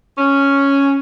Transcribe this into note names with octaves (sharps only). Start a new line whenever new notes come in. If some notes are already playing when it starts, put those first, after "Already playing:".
C#4